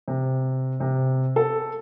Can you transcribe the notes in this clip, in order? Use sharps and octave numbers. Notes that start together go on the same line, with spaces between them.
C3
C3
A4